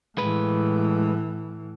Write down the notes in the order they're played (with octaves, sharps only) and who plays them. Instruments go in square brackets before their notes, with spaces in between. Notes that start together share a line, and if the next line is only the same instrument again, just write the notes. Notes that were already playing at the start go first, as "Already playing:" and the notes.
[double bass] A2 E3 [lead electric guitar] G#3 B4